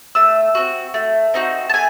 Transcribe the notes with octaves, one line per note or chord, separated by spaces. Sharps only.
A3 E6
C4 D#4 F#4
A3
C4 D#4 F#4
A5
A3 G#5